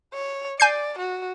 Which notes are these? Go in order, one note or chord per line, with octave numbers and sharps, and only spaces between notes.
C#5
D5 G#5 G6 C7
F#4